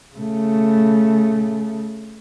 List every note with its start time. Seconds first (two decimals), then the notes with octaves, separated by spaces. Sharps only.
0.15 C#3 A3